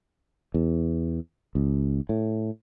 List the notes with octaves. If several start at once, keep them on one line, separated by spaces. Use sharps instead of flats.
E2
C#2
A2